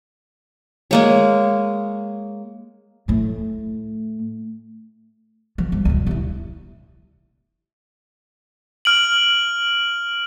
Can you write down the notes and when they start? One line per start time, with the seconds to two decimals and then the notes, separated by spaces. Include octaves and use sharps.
0.91 G#3 A#3 C#5
3.08 A2 A3
5.58 F3
5.72 G2
5.85 D2 A#2
6.07 G2 E4
8.85 F6 D7 F#7